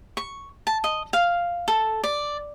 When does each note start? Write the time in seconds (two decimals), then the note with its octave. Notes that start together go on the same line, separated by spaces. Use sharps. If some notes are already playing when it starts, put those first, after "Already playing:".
0.17 C#6
0.67 A5
0.84 D#5
1.13 F5
1.68 A4
2.04 D5